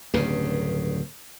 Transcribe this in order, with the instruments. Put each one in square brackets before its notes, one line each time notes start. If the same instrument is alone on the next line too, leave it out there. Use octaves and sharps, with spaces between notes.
[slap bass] D1 G2 C#3